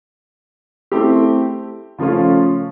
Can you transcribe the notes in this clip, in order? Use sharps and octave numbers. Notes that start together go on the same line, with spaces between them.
A3 C4 E4 G4
C#3 F3 A3 C#4 F4